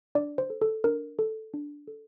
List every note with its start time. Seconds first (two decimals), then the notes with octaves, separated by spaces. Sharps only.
0.15 D4 D5
0.38 C5
0.50 A4
0.62 A4
0.84 D4 A#4
1.19 A4
1.54 D4
1.88 A4